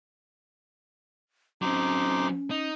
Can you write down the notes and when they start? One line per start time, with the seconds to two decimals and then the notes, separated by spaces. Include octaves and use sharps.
1.62 F#3 C4 C#4 D#4 C6 D6
2.51 D#4 D#6